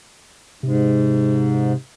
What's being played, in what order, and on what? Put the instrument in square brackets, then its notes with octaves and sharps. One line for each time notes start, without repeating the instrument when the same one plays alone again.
[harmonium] G#2 [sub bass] C3